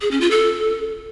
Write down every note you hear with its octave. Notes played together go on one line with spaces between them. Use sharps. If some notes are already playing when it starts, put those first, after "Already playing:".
G#4
C#4
F4
A4